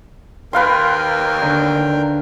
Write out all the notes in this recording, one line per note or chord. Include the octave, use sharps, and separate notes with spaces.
D#2 A#4 B4 F5 G5 C6
D3